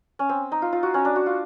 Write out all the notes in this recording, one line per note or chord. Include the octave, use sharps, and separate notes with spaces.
C#4
C4
D#4
F4
F4
F#4
C#4
D4
F#4
F4